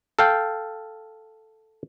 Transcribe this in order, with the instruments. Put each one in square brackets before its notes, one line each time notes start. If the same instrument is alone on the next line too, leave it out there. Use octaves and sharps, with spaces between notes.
[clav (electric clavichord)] A4 F5 G5